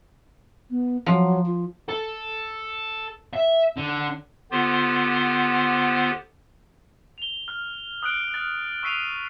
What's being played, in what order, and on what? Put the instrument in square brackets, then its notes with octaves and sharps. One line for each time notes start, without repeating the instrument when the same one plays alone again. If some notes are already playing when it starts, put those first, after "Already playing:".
[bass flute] B3
[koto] F3 [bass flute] F#3
[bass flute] F4
[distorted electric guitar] A4
E5
D3
[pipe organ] D3 B3 F4 G4 C5
[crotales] F7 G7
F6
D#6 F#6 D7 G7
F6 A6
C#6 E6 B6 C7 D#7 F7